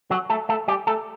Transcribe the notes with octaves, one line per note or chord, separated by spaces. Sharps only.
F#3 F#4
A3 A4
A3 A4
G3 G4
A3 A4